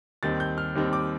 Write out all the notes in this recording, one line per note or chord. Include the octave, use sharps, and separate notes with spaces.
D#2 D#3 G3 C4 A6
G6
F6
D#2 D#3 G3 C4
D6